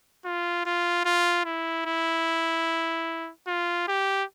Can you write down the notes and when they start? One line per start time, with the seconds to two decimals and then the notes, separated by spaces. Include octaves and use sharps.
0.25 F4
0.66 F4
1.05 F4
1.45 E4
1.86 E4
3.47 F4
3.88 G4